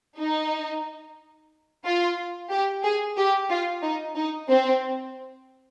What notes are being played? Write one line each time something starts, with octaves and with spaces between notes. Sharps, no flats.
D#4
F4
G4
G#4
G4
F4
D#4
D#4
C4